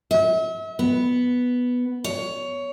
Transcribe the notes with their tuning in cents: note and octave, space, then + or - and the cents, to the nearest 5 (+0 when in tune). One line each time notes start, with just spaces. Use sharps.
E5 -40
B3 +0
C#5 +15